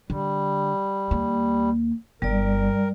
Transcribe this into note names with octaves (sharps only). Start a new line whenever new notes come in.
D3 G3
D#2 A#3
G1 G3 A#4 D5